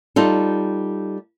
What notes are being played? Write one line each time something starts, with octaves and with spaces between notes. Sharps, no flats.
G3 D#4 F4 A4